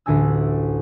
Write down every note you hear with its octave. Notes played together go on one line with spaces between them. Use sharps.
A1 D2 E5 G#5 E6